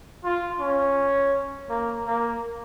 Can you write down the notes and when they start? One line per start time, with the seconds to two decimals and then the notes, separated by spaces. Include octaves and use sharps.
0.24 F4
0.60 C#4
1.70 A#3
2.06 A#3